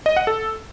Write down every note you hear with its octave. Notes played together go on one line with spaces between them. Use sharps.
D#5
F#5
A4